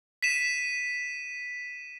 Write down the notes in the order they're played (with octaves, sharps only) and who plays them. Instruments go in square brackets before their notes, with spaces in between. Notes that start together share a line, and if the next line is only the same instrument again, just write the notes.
[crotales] B6 D#7 E7